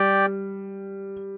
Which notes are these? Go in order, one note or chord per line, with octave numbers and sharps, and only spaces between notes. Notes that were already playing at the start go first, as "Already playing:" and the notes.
Already playing: G3 G4 D5 G5